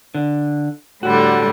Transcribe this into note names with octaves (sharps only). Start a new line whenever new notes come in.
D3
A2 D3 G3 F#4